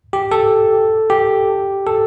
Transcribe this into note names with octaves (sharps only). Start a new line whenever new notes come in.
G4
A4
G4
A4